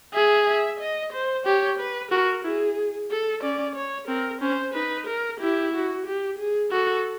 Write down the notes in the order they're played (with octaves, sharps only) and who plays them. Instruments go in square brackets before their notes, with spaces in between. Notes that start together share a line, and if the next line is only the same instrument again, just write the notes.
[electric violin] G#4 [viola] E5
[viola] E5
D#5
C5
[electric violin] G4 [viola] C#5
[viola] B4
[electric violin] F#4 [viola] A#4
[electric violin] E4 [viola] G#4
[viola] A4
[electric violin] C#4 [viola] D5
[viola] C#5
[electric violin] C4 [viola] A#4
[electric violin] C#4 [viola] C5
[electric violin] D#4 [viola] B4
[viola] A#4
[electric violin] E4 [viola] G4
[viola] F#4
G4
G#4
[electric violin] F#4 [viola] A4